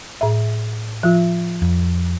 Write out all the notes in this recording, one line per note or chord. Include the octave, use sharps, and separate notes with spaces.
A2 E5
F3 F4
F2